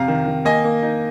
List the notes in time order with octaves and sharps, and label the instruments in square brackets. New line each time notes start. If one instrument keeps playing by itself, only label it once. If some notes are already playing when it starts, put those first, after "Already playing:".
Already playing: [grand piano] F2 C3 F5 A#5
D#3
D#3
A#3 D#5 G#5
A#3
D#4